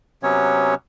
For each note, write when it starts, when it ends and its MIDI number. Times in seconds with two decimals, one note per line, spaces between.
0.23 0.74 48
0.23 0.74 54
0.23 0.74 59
0.23 0.74 61
0.23 0.74 73